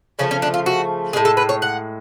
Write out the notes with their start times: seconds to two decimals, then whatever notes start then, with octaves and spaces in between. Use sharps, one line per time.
0.19 C#3 F3 A3 C#4
0.31 C#4
0.42 D4
0.54 F4
0.66 F#4
1.13 A2 F3 G#3 G#4
1.25 A4
1.37 B4
1.49 C#5
1.62 F#5